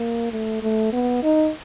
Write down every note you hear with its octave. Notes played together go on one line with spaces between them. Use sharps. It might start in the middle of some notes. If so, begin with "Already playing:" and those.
Already playing: A#3
A3
A3
B3
D#4